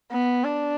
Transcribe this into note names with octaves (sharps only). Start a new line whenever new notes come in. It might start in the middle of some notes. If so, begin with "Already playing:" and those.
B3
D4